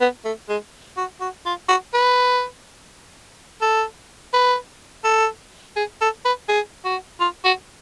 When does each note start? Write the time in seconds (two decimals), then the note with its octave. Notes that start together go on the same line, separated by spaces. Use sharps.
0.01 B3
0.25 A3
0.49 G#3
0.97 F#4
1.21 F#4
1.45 F4
1.69 F#4
1.93 B4
3.61 A4
4.33 B4
5.04 A4
5.76 G#4
6.01 A4
6.25 B4
6.48 G#4
6.85 F#4
7.20 F4
7.45 F#4